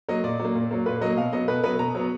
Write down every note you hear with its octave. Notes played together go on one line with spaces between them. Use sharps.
F#3 A#3 D#5
A#2 D5
F#3
A#3
A#2
F#3 A#3
A#2 B4
F#3 A#3 D#5
B2 F5
F#3 B3 D#5
B2 B4
F#3 B3 B4
B2 A#5
F#3 B3